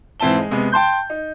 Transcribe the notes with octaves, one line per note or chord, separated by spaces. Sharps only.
G#2 E3 C4 E5 A5 G7
G#3
C3 G#3 B3
G5 A5 C6 G6
D#4